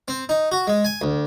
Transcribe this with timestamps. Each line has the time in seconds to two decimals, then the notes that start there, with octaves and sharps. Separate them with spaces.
0.08 C4
0.29 D#4
0.52 F#4
0.67 G#3
0.85 G#5
1.01 D2